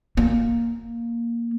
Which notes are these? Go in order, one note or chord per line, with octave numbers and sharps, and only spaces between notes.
A#3